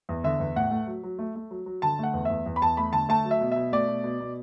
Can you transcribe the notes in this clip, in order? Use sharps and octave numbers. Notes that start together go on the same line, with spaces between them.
E2
D3 E5
E2
A2 F#5
A3
F#3
F#3
A3
A3
F#3
F#3
D3 A5
A3 F#5
E2
E2 E5
E2
B5
E2 A5
A3 B5
D3 A5
A3 A5
F#3
E5
B2
B2 E5
A3 D5
B2
B2
B2